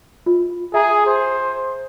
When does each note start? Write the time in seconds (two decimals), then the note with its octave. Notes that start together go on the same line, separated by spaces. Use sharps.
0.26 F4
0.74 G#4 E5 A#5
1.06 C5